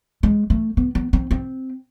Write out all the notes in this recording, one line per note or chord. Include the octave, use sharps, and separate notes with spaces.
G#3
A3
B3
B3
C4
C4